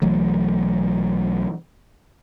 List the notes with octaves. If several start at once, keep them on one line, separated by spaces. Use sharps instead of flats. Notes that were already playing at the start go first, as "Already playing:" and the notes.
B1 E3 F#3 A3